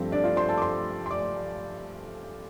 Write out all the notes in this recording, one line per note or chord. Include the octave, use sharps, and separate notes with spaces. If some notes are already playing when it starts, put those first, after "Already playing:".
Already playing: G2 F3 A3 C4
D4 D5
F4 F5
C5 C6
A4 A5
D6
C5 C6
C6
D5 D6